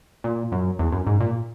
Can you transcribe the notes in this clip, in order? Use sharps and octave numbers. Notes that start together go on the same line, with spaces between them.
A#2
F#2
E2
F#2
G#2
A#2